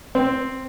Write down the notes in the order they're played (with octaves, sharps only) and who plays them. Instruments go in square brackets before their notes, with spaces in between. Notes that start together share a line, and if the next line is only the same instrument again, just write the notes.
[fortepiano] C4